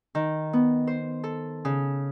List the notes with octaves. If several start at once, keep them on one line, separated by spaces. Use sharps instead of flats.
D#3
B3
C5
A4
C#3